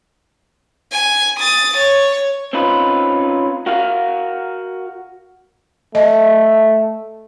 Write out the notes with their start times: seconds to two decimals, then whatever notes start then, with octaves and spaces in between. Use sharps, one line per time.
0.92 G#5
1.40 D#6 A6
1.77 C#5
2.53 C4 C#4 D#4 F4 B4
3.66 F#4 A#4 F5
5.95 A3 D#5